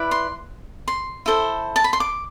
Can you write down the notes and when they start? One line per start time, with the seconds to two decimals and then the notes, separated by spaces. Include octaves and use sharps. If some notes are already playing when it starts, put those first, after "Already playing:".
Already playing: E4 B4 D5
0.11 C6
0.88 C6
1.26 E4 A4 C5
1.76 A5
1.84 B5
1.93 C6
2.00 D6